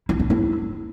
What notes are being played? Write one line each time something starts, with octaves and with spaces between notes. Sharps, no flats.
E4
D4
E4